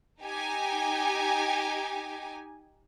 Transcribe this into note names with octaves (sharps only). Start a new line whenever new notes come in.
D#4 G4 G#5